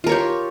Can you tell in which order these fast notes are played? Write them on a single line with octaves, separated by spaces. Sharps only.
F4 A#4 C#5 G4